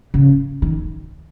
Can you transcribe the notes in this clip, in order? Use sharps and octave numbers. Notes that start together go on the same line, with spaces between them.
C#3
D#3